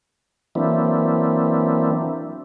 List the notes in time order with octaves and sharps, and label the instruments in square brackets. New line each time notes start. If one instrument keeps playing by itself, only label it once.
[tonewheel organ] E3 F#3 A#3 C4 D4 E4